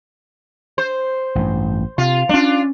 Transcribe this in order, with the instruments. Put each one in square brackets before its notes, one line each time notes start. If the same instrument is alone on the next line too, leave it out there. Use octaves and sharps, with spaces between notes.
[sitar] C5
[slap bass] A1 G2
[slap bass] C3 [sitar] F4
[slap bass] F#3 C#4 [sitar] D4 F4